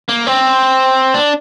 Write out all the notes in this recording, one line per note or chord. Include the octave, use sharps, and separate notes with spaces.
A#3
C4
D4